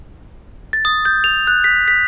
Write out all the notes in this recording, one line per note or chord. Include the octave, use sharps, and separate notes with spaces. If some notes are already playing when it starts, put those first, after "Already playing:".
A6
D#6
G6
F7
F#6
B6
B6